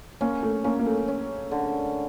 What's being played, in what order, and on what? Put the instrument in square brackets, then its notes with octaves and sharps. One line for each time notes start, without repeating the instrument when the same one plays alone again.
[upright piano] A#3 [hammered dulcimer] C#4
[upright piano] A3
[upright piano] A#3 [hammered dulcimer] C#4
[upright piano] A#3
A3
[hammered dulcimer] C#4
D3